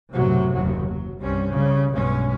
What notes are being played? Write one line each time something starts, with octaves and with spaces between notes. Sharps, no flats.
B1 F#2 A2 C3 F#3
F#1 D#2 F#3
F#3
C2 G2 G3 C4 C#4
C#3 G3
B1 G2 B2 G#3 C#4